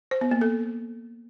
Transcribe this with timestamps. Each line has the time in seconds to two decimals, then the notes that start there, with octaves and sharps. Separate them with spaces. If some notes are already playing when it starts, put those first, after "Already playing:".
0.11 C5
0.21 B3
0.31 A#3
0.41 A4